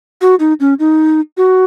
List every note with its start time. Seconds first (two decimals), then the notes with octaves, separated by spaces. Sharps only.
0.21 F#4
0.40 D#4
0.60 C#4
0.80 D#4
1.37 F#4